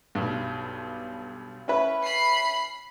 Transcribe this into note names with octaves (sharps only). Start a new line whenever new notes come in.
B1 G2
C#4 E4 B4
B5 C7